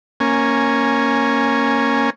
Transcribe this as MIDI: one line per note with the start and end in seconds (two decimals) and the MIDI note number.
0.20 2.10 58
0.20 2.10 61
0.20 2.10 80